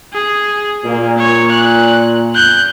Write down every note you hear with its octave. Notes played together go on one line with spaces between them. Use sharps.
G#4
A#2 A#3
C#5
F#6
F#6 G6